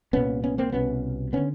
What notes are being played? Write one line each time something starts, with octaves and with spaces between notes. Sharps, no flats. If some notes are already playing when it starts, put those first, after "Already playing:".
C2 A#2 B3 C#4
B3 C#4
A#3 C4
C2 B2 B3 C#4
D3 B3 C#4